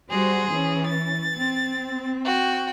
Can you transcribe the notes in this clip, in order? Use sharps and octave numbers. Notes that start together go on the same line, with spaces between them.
G3 F#4 G#4 C5
E3 C#4
A6
C4
F#4 G5